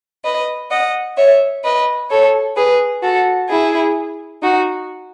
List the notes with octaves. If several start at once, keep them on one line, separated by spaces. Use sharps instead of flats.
B4 D#5
D#5 F#5
C#5 E5
B4 D#5
A4 C#5
G#4 B4
F#4 A4
E4 G#4
D#4 F#4